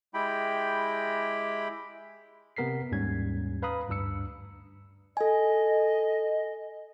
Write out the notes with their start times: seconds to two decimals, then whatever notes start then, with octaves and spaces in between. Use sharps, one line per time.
0.14 G#3 E4 G4 G5 B5
2.57 C3 B3 A#4 B6 C7
2.91 D#2 G#2 G3 C#4 G#6
3.62 B4 F5 A#5 B5 D#6
3.89 D2 G2 D4 E6 C#7
5.17 A4 D#5 G#5